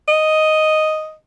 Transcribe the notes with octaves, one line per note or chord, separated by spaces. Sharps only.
D#5